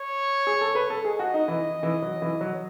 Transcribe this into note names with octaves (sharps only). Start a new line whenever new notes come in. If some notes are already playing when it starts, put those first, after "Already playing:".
Already playing: C#5
G#4
A4
B4
A4
G#4 D#5
F#4
D#4
E3
E3
F#3
E3
F#3